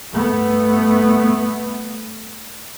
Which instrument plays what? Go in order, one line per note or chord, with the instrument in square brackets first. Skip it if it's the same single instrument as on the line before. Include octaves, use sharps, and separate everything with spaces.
[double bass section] G2 A3 B3